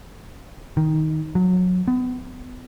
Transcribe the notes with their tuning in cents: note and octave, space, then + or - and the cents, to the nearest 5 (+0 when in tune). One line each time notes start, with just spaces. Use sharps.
D#3 +10
F#3 -20
B3 +30